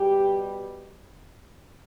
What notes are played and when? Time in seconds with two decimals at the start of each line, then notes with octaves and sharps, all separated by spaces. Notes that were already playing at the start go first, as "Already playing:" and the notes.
Already playing: B2 G3 G4